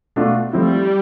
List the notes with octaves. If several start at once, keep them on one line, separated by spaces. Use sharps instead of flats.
B2 A3 D4 F4
F3 G3 A3 C4 E4